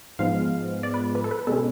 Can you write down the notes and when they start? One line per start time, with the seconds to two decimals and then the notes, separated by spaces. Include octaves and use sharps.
0.19 G#2 F3 G#3 B3 F5
0.83 D5
0.94 B4
1.15 B4
1.24 A4
1.31 B4
1.47 B2 G#3 C#4 A4